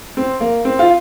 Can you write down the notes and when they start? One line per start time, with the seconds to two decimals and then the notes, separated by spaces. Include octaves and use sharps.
0.17 C4
0.41 A#3
0.65 C4
0.79 F4